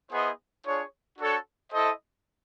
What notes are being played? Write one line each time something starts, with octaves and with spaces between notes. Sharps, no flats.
B3 E4 G#4 C5 D#5
D4 F4 G#4 C#5
D4 F#4 A4 C#5
E4 A4 C5 D#5